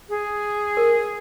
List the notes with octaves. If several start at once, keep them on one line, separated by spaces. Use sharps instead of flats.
G#4
A#4